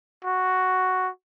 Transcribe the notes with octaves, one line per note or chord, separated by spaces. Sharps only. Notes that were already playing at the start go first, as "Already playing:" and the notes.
F#4